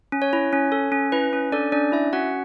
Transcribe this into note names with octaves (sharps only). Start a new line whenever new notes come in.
C#4
C#5
E4
C#4
A4
C#4
E4 B4
C#4
D4 A4 D5
C#4 D4 D5
E4 E5
C#4 F#4 F#5